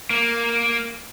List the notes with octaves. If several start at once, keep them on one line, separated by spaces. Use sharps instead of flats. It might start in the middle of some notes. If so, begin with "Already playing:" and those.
A#3